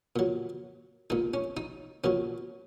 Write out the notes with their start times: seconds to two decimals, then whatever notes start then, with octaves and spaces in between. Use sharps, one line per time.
0.16 A#2 F#3
1.10 A#2 G#3 D#4
1.34 C#4
1.57 D#4
2.04 A#2 F#3 C#4